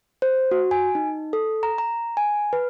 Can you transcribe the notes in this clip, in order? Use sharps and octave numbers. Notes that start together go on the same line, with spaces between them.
C5
F#4
G#5
D#4
A4
A#5
A#5
G#5
B4